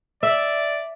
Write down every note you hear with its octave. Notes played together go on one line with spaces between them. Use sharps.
D5 E5